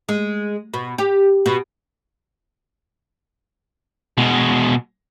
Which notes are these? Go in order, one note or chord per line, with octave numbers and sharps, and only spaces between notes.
G#3
B2
G4
B2
B2 G#3